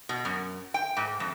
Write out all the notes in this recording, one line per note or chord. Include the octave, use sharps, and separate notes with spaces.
B2
F#2
G5
G#2
F2